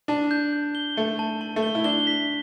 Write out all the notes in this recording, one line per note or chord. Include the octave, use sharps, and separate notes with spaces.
D4 A5
G6
G6
G7
A3 A5
A5
A5
A3
G7
E4
D4 G7
B6